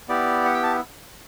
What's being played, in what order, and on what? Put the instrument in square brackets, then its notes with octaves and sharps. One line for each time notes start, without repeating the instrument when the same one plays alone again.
[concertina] B3 E4 G4 D5
F#5
G5
A5